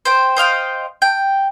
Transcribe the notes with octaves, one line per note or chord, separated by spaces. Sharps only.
C5 G5
C5 D#5 F5 G5
G5